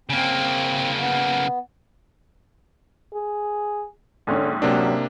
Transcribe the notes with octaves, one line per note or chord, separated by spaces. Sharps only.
C#3 A#3 C4
B3
G#4
A#1 G#2 D3 C#4
C3 F#3 A#3 D4